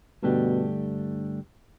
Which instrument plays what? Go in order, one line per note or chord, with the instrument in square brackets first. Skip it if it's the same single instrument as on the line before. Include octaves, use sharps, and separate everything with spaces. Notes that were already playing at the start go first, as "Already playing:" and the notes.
[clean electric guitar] G2 D3 A3 D4 G4 [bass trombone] B2